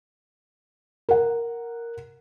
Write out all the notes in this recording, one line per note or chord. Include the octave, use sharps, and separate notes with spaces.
A#4 F#5